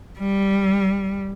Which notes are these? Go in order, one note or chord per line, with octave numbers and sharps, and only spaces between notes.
G3